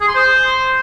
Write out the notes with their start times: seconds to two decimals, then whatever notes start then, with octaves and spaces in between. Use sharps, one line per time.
0.01 G#4
0.08 C6
0.15 C5